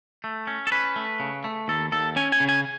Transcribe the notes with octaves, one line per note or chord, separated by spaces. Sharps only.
A3
C#4
A4
C#4 B4
A3
C#3
A3
D#2 A4
D#2 A4
C#4 G#5
G#5
C#3
G#5